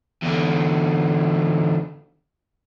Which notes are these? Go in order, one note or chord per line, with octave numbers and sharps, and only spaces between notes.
E2 D3